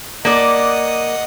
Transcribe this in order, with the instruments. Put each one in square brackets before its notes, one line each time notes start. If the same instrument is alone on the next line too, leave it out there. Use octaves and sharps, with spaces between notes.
[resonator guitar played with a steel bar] A#3 D5 [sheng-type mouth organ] D#5 F#5 D#6